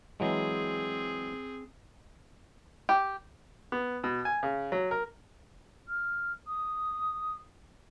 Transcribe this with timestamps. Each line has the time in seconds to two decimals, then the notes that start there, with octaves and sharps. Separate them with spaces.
0.20 E3 F#3 G#3 C4 G#4
2.89 G4
3.72 B3
4.04 B2
4.25 G#5
4.43 C#3
4.72 F#3
4.91 A#4
5.88 F6
6.48 D#6